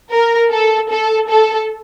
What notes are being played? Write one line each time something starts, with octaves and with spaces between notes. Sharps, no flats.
A#4
A4
A4
A4